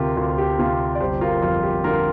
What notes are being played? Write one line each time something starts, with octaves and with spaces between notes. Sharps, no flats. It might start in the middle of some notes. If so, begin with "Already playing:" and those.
Already playing: D2 C3 F4 G4 A#4
D2 F4
G4
C3 F4
D5
G1 G4 C5
F4 A#4
F2 F4
G4
D3 F4 A#4